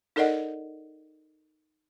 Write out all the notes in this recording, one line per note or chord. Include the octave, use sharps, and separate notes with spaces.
D#4 A4 A#4 D5 D#5 F#5